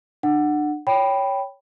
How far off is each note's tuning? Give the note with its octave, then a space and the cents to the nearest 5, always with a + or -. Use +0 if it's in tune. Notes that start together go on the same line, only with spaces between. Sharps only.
D4 +35 F#5 +0
C#5 +5 G5 +0 B5 +0